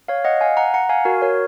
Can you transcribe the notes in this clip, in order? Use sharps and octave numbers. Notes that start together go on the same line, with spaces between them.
C#5 F5
D#5 F#5
F5 G#5
F#5 A#5
F#5 A#5
F5 G#5
F#4 A#4
A#4 C#5